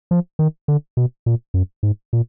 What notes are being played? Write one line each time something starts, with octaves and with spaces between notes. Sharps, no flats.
F3
D#3
D3
B2
A#2
F#2
G#2
A#2